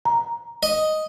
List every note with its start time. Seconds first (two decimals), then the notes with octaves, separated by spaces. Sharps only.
0.05 A#5
0.63 D#5